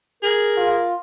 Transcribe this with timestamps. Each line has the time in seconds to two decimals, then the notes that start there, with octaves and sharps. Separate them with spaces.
0.23 G#4 A#4
0.57 F4